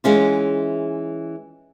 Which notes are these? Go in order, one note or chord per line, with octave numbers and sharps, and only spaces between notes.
E3 G#3 C#4 F4